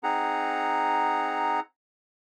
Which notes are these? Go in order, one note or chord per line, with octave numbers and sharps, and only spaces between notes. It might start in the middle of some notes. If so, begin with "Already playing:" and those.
C4 D#4 G#4 F#5 A#5